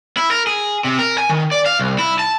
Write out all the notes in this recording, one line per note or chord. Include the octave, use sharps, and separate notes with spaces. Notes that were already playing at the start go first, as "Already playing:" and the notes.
E4
A#4
G#4
C3
A#4
G#5
D#3
D5
F5
C2
E4
A5